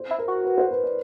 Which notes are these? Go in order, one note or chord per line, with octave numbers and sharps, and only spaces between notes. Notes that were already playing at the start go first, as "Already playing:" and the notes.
Already playing: C5
E4
A#4
F#4
B4
C5
B4
D5